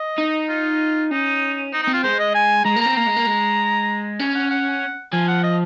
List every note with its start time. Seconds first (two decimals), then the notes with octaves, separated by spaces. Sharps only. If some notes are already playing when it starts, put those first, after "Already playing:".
Already playing: D#5
0.18 D#4
0.49 F4
1.11 C#4 D#4
1.73 C4 D#4
1.83 D#4
1.88 C4
1.93 F4
2.03 G#3 C5
2.19 D#5
2.35 G#5
2.65 G#3 A#5
2.76 A#3
2.81 C4 A#5
2.96 A#3 A#5
3.07 G#3
3.17 A#3
3.27 G#3
4.20 C#4 G#5
4.35 F#5
4.51 F#5
5.13 F3 G#5
5.28 F#5
5.43 D#5